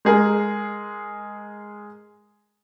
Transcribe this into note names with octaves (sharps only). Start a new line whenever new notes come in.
G#3 G#4 A#4